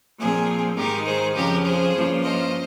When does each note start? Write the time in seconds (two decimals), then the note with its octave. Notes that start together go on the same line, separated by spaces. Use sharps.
0.18 A#2 F3 C4 G#4
0.77 G#2 D#3 G#3 D#4 G4 A#4
1.06 G#4 C5
1.35 F2 C#3 F3 G4 A#4
1.65 G#4 C5
1.94 G2 F3 A#3 C#4 F4
2.23 C5 D#5